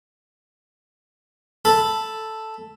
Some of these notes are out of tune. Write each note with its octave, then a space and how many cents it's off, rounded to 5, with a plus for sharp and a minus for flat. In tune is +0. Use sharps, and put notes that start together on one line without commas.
A4 +0 B5 +0